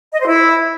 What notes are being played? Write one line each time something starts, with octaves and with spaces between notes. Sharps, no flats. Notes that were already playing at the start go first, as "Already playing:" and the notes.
D#5
C5
E4